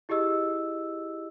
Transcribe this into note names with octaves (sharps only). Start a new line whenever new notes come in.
E4 G4 G#4 D#5 E6